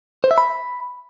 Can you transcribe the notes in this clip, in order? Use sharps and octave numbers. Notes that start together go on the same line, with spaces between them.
C5
E5
B5